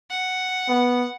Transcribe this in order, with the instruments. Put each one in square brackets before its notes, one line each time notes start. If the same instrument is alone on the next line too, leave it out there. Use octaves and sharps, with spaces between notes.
[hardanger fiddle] F#5
[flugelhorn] B3